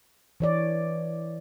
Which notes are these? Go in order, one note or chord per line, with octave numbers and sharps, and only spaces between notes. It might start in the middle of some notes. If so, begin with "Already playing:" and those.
E3 C#5 D5